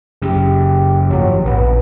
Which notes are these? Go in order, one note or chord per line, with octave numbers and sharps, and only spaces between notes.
F#2 C#3 G4
G#1 F3 F#3
A#1 B3